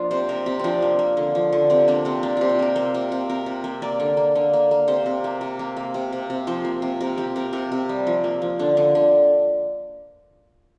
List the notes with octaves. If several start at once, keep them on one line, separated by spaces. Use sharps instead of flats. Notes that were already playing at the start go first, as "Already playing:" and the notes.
Already playing: F3 A#3 D4 F4
C3 C5
C3 A#4
C3 G4
F3 C4 D4
A#3
A#3
D3
F3
D3
C3 C4
A#3 D4
C3 C4
A#3 D4
C3 F4
G4
A#3 A#4
A#3 C5
C3
C3
C3 A#4
C3
A#3
A#3 D5
D3
A#3
D3
A#3
A#3
C3 C5
C3
A#3
C3
A#3
A#3
C3
C3
C3
F3 C5
A#3
C3
C3 A#4
A#3 G4
C3 A#4
C3 A#4
C3
G3
F3
A#3
F3
D3 D4
D3
D3